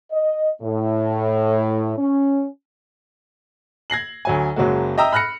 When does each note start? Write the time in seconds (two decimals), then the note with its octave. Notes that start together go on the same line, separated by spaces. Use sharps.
0.11 D#5
0.61 A2
1.98 C#4
3.90 G#6 A#6 C7 F#7
4.25 D2 F#3 G#5
4.56 F#1 F#3 G#3 A#3 F#4
4.98 D#5 E5 G5 A#5 D#6 E6
5.13 B5 F6 F#6 A#6 C#7